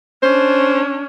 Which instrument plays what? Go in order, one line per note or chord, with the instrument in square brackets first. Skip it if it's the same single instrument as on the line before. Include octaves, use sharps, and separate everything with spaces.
[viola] C#4 D4 [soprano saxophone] C5